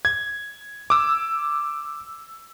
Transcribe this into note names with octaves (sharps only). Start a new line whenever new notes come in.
G#6
D6 E6